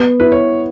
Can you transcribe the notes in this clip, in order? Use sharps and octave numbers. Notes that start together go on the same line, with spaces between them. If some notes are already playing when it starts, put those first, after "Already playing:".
Already playing: B3
E4 B4
C#5